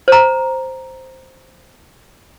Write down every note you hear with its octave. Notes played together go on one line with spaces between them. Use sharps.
C5 A#5